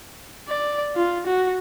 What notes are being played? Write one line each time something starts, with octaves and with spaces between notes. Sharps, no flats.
D5
F4
F#4